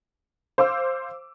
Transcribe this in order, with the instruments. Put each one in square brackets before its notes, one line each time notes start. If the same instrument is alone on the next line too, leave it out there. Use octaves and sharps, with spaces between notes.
[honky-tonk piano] C5 F5 D6 E6